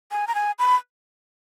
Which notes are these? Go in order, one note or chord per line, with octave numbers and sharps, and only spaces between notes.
G#5
A#5
G#5
B5